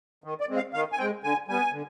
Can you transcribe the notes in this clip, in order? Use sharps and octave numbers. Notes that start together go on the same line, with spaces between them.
D#3
D5
G#3 C4
F5
D#3 F5
G#5
G#3 C4 G5
D3 G#5
G3 B3 G#5
D3